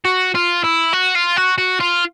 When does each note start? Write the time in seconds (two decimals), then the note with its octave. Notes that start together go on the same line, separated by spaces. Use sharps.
0.05 F#4
0.35 F4
0.64 E4
0.93 F#4
1.15 F4
1.37 F#4
1.58 F#4
1.80 F4